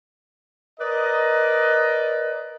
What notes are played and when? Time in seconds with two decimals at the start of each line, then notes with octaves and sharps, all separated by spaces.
0.79 A#4 B4 D5 D#5